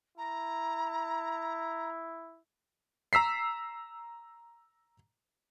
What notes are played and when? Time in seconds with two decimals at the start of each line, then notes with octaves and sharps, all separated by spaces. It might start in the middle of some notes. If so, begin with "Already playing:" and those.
0.18 E4 A#5
3.13 A#5 E6 B6 C7